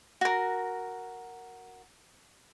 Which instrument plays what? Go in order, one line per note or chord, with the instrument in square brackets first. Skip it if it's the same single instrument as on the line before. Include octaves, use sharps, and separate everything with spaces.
[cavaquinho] F#4 A#4